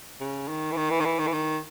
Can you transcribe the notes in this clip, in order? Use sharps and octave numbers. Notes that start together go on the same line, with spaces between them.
C#3
D#3
E3
D#3
E3
D#3
E3
D#3
E3
D#3